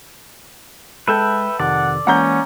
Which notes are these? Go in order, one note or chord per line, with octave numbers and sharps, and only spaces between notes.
G#3 A4 B4 E5 G5
F2 C3 D#3 D5 F#5
E3 G#3 A#3 C#4 F#5 A#5 G6